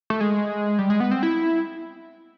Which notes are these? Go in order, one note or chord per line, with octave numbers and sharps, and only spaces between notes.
A3
G#3
G3
G#3
B3
C4
E4